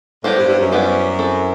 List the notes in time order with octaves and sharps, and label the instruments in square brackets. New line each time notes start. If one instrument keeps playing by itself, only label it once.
[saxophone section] A2 [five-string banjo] G3 B3 E4 G4 C5
[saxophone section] G2
G2
F#2
[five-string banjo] G3 B3 E4 G4 C5
C4 E4 A4